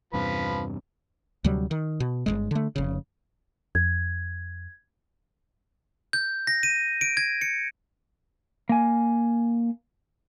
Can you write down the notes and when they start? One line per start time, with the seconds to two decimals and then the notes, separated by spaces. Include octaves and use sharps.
0.13 E2 G2 C3 F3 B4
1.44 D2 C3 F#3 G3
1.71 D#3
2.00 B2
2.26 G1 E2 G#3
2.51 D3 A3
2.76 F1 C#3
3.75 F2 G#6
6.13 G6
6.47 A#6
6.63 D#7
7.01 D7
7.17 G#6
7.41 C#7
8.69 A#3 G#5